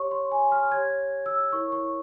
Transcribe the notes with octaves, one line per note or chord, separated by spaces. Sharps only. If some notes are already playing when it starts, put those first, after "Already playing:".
Already playing: G4 C#5 C#6
C6
G#5
F6
G4 C#5 G#6
E6
E4 A#4 C#5 C#6
C#6